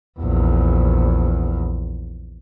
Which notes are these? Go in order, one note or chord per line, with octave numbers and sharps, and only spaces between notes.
A#1 E2